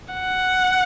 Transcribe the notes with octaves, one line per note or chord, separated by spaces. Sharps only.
F#5